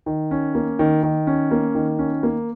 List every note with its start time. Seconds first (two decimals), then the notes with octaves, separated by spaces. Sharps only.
0.06 D#3
0.31 C#4
0.55 A#3
0.79 D#3
1.03 D#3
1.27 C#4
1.51 A#3
1.75 D#3
1.99 C#4
2.23 A#3